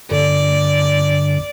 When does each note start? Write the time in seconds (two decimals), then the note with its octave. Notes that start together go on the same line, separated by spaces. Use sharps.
0.11 G2 D3 D5